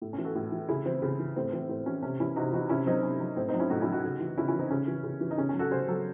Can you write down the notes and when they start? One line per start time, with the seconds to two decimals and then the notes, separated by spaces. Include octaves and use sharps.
0.02 A2
0.13 C#4
0.18 E3
0.24 F#4 A4
0.35 A2
0.52 E3
0.68 C#3 E4 G#4
0.86 E3 C4
1.02 C#3
1.20 E3
1.36 A2 C4
1.53 E3 C4
1.69 A2 C4
1.86 E3 C#4
2.02 C3 C#4
2.20 E3 C#4 E4
2.36 C3 D#4 F#4
2.53 E3 D#4 F#4
2.69 C3 C#4 E4
2.87 F#3 C4 D#4
3.03 C3 C#4
3.20 F#3
3.37 A2 C4
3.49 C4 D#4
3.54 F#3
3.60 C#4 E4
3.70 A2 D#4 F#4
3.82 F#3 C#4 E4
3.92 D#4 F#4
4.04 C#3
4.21 E3
4.38 C#3 C#4 E4
4.48 C#4 E4
4.54 E3
4.59 C4 D#4
4.70 C#3 C#4
4.88 E3
5.03 C#3
5.21 E3
5.31 D#4
5.38 C#3 C#4
5.49 C#4
5.54 F#3
5.59 F#4 A4
5.71 C#3 G#4 C5
5.88 F#3 F#4 A4